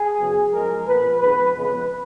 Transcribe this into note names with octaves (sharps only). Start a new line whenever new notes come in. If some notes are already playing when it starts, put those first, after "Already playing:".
Already playing: G#4
F#2 C#3 F#3 B3
F#2 F3 G#3 A#4
A#2 F3 B3 B4
F2 D#3 G#3 B3 B4
F2 C#3 G#3 B3 B4